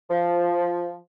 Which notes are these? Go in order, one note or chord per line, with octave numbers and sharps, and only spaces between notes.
F3